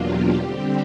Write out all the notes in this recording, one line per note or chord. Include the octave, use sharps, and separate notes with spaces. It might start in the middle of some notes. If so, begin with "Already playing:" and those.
Already playing: E2 B2 F#3 A#3 D4 F4 G4
D3 G3 C4